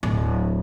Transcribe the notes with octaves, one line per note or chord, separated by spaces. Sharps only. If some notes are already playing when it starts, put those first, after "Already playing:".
D1